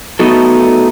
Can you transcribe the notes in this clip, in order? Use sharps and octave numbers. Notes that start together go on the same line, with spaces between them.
A3 B3 D#4 F#4 A4